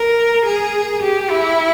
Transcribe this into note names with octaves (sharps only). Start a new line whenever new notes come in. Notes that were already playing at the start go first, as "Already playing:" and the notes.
Already playing: A#4
G#4
G4
E4